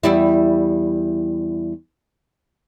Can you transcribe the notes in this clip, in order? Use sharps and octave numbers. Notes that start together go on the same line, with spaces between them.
E2 G3 E4